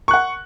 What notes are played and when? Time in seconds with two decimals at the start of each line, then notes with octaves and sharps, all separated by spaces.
0.08 C#6
0.11 F#6
0.14 F#5